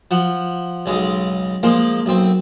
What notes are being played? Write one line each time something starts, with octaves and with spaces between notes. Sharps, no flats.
F3 F#5
B1 C#3 G#3
F3 G#3 A#3
B1 C4